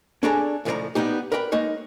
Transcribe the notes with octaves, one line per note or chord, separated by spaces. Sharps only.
C#4 D4 G#4 A4 D5 A#5
C#2 A2 F3 B4 D5 A#5
G3 A#3 B3 D#4 G4
A#4 B4 D5 G5 B5
G#3 A#3 D#4 C#5